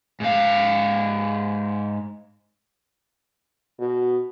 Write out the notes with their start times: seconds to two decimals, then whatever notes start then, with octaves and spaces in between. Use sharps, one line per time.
0.20 G#2 F5
3.80 B2